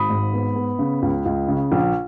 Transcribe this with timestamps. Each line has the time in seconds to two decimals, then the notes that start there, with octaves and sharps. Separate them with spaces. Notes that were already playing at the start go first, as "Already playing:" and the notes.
Already playing: G#1 B5 D#6
0.10 G#2
0.33 B3
0.56 B3
0.79 C#3
1.02 C#2
1.25 C#2
1.48 C#3
1.72 A#1